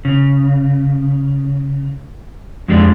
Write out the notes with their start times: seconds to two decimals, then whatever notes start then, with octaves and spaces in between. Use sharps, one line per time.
0.05 C#3
2.68 F2 D3 G#3 G4 G#4 D5